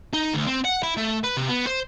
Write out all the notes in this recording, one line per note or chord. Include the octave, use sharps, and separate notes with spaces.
D#4
D2
C4
F#5
E4
A3
B4
C3
B3
C5